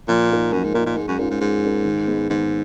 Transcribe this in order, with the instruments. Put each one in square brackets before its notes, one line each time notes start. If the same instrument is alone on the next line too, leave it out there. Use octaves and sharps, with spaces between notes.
[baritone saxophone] A#2 [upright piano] F3
[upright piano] A#3 D#4 A#4
[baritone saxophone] F#2 [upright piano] F3
[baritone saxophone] G#2
[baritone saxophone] A#2 [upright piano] A#4
[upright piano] A#3 D#4
[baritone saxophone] A#2
[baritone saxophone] G#2 [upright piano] G#3
[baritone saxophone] F#2
[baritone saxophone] G#2 [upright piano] C#4 F4 A#4
[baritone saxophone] G#2
[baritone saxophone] G#2 [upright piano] G#3
[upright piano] C#4 F4 A#4
D#3
G#3 B3
[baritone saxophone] G#2 [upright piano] D#3